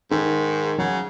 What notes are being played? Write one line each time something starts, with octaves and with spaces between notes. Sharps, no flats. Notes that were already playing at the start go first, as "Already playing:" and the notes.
G#2 D#3
C#3 F#3